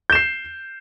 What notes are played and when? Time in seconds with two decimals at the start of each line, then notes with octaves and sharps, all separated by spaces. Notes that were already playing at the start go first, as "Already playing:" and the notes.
0.10 G6
0.12 E7
0.15 C7